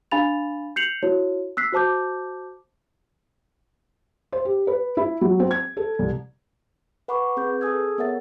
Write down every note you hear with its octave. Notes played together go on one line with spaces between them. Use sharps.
D4 F5 G#5 B5 A6 F7
G6 C7 C#7 F7 F#7
E4 F#4 C#5
E6 F#6 B6 C7
F#4 C5 A5 D6 G6
C5
G4
B4
E4
F#3
C4
G#6
A4
C2
B4 F#5 B5 C#6 D6
C4 G#4 B4 G6
G#4 A4 G#5 D#6 E6 G#6
B3 A#4 C#5 E5 F#5 A6